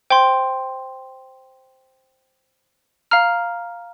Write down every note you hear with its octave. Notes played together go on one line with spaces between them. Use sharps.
C5 G5 C6
F5 A#5 F6